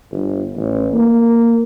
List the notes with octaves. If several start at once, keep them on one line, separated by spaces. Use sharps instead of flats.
G1
A1
A#3